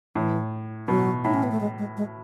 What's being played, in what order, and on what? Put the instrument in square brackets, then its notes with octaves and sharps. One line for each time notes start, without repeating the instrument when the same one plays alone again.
[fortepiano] A2 [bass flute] E3
[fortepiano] B2 [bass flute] F#3
[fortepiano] A2 [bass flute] D#4
[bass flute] C#4
B3
A3
G#3
G#3
G#3